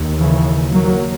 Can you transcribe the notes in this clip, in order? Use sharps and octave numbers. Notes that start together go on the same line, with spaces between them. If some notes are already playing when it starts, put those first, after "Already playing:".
Already playing: D#2
C#3 E3
F#3 A#3